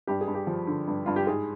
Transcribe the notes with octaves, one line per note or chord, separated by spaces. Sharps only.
G2 G4
G#4
G2
G4
F3
D3
G2
G2 F4
G4
G#2 G#4